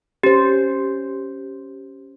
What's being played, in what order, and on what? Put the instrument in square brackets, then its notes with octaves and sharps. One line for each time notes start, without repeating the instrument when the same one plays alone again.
[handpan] C#4 C5 [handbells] G4